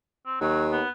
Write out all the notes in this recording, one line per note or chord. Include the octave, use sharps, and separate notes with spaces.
C4
D#2 F#3
B3